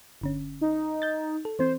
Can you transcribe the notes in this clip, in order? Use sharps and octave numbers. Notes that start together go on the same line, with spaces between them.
G1 D3 C#4
D#4
G6 A6
A4
E3 C4 C5